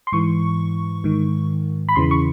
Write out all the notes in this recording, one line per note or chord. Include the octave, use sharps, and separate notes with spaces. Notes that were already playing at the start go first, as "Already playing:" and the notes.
C6
G#2 E3 C#6
G#2 D#3
B5
E2 C#3 E3 C6
C#6